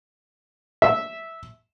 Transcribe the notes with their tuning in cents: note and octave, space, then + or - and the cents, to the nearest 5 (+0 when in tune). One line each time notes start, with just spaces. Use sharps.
E5 -10